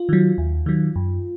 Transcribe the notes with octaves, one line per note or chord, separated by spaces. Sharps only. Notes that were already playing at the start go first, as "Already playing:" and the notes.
Already playing: F4
D#3 F#3
D#2
D#3 F#3
F#2